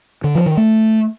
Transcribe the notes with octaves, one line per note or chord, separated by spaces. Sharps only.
D3
F3
D#3
A3